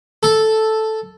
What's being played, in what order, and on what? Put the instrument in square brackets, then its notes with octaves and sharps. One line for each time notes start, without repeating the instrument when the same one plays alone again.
[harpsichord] A4